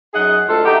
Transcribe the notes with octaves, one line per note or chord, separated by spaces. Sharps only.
F#2 D#4 G#4 D#5 F#5
D2 G#3 F4 A4
D#4 F#4 G4 E5